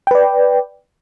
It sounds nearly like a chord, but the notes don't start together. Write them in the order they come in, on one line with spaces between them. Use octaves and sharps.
G5 B4 D5